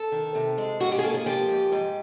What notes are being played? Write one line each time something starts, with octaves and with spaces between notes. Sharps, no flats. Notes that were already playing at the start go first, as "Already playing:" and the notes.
Already playing: A4
D#3
C3
G#3
G#2 F#4
G4
G#4
A#3 A4
G#4
F3 G4
G#2
G#2